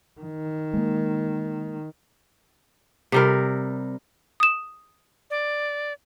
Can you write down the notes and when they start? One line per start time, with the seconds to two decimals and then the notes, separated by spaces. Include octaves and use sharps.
0.21 D#3
0.74 G#3 A#3
3.12 C3 G3 A#4
4.40 D#6 E7
5.30 D5